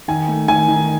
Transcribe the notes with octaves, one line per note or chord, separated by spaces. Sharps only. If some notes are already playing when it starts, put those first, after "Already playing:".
D#3 G#5
A3
D#3 G#5
D#3